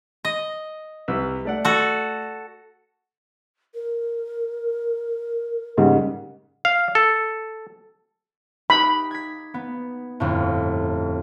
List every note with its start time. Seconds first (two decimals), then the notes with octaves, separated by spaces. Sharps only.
0.25 D#5
1.08 C2 B4 E6
1.45 A3 D5 F#5
1.65 F#4 A4
3.75 A#4
5.77 G#2 C#3 G3
6.65 F5
6.95 A4
8.70 D#4 G4 B5
9.11 G#6 B6
9.54 B3
10.20 G1 F2 A2